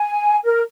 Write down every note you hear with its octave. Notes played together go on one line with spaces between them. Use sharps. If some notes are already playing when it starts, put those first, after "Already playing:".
Already playing: G#5
A#4